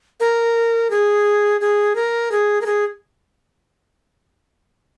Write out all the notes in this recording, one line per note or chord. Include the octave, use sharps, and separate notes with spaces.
A#4
G#4
G#4
A#4
G#4
A#4
G#4